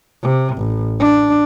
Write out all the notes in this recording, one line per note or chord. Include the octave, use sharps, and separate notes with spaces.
C3
A1
D4